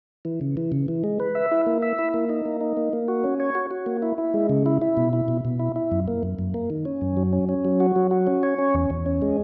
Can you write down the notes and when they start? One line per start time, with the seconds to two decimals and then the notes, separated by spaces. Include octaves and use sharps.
0.25 E3
0.41 C#3
0.57 E3
0.72 C#3
0.88 E3
1.04 G#3
1.20 B4
1.35 E5
1.51 E4
1.67 A#3
1.82 E5
1.99 E4
2.14 A#3
2.29 D#4
2.46 A#3
2.61 D#4
2.77 A#3
2.93 A#3
3.08 F#4
3.24 C#4
3.40 C#5
3.55 F#4
3.71 F#4
3.86 A#3
4.02 E4
4.18 E4
4.34 G#3
4.49 C#3
4.66 E4
4.82 E4
4.97 B2
5.13 E4
5.28 B2
5.45 B2
5.59 E4
5.76 E4
5.92 F#2
6.08 A#3
6.23 F#2
6.39 F#2
6.54 A#3
6.70 D#3
6.85 C#4
7.01 F#2
7.17 F#3
7.33 C#4
7.49 C#4
7.65 F#3
7.80 F#4
7.96 F#3
8.11 F#4
8.27 C#4
8.43 C#5
8.58 C#4
8.74 E2
8.90 E2
9.06 C#4
9.22 G#3